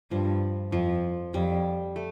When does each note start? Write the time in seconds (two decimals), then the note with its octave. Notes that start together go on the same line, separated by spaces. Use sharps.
0.11 G2 F3
0.72 F2 F3
1.34 F2 G3
1.96 A3